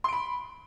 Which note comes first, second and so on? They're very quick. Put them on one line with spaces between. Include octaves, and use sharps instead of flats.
C6 D7 B5